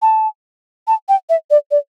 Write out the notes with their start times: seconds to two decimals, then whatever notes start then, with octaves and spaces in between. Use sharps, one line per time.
0.02 A5
0.88 A5
1.09 G5
1.29 E5
1.51 D5
1.71 D5